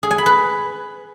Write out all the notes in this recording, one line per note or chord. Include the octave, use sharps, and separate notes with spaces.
G#4
G#5
B5
B4